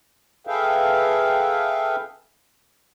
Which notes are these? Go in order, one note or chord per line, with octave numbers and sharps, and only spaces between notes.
G#4 A4 B4 E5 F5 G5